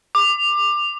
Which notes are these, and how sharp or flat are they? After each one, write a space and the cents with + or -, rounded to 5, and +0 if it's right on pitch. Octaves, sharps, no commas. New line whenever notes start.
D6 +20